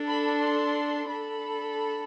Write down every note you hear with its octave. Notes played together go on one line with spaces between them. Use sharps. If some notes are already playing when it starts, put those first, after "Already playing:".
Already playing: D4 A4
B5
C6
D4 A4 B5